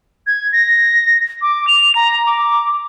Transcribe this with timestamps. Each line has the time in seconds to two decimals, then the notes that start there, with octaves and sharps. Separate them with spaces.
0.27 G#6
0.53 A#6
1.42 D6
1.67 F7
1.95 A#5
2.26 D6